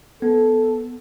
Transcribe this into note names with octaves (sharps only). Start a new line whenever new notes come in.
B3 A4